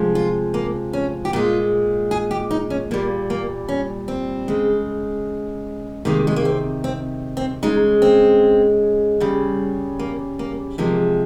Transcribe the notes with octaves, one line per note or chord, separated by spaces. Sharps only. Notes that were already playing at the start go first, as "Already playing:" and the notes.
Already playing: C3 F3 G#3
F4
A#3
C#4
G4
A#2 G#3 F4
G#4
G4
D#4
C#4
A#2 G3 A#3
A#3
C#4
C4
C#3 G#3
C3 D#3 G#3 A#3
G#3
A#3
C4
C4
C4
C#3 G#3 D#4
C4
C#3 G3
A#3
A#3
C3 F3 G#3 A#3